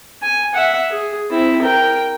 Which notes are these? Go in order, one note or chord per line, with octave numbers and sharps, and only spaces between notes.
G#5
E5 F#5
G#4
C4 E4
A#4 G5